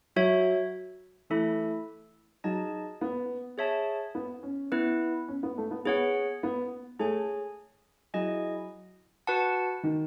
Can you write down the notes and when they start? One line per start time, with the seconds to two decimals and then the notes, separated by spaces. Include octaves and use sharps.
0.16 F#3 F#4 C#5 E5
1.30 E3 A3 E4 A4 E5
2.44 F#3 D#4 G#4 D#5 A5
3.01 B3
3.58 G#4 C#5 E5 A5
4.15 B3
4.43 C#4
4.72 B3 E4 B4
5.28 C#4
5.43 B3
5.58 A3
5.71 B3
5.86 B3 G#4 C#5 F#5
6.43 B3
6.99 A3 G#4 C#5 G#5
8.14 F#3 E4 G#4 D#5 G#5
9.27 F#4 B4 F#5 A5
9.83 D#3